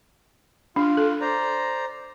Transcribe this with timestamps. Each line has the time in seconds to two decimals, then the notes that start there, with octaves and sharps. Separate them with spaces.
0.76 D4 F4
0.97 A4
1.21 C5 D5 A#5